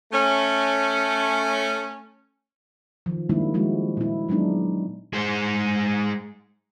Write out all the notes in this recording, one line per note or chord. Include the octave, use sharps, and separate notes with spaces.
A3 C#4
D#3 F3
D#3 G3 G#3 A#3 D4 E4
F3 G3 G#3 E4 F#4
A#2 E4
F#3 G#3 B3 D4 D#4
G#3 C5